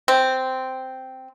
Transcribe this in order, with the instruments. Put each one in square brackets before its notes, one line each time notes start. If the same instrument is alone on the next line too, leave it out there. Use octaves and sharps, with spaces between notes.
[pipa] C4